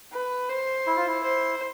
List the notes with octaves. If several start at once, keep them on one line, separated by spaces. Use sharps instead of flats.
B4
C5
E4
F4
E4
C5